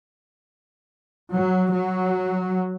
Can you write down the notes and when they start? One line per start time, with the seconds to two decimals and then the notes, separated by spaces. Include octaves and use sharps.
1.33 F#3
1.73 F#3